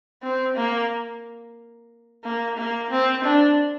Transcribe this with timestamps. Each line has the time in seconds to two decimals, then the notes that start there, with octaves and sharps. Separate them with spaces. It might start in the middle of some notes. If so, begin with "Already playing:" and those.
0.23 C4
0.56 A#3
2.24 A#3
2.57 A#3
2.91 C4
3.24 D4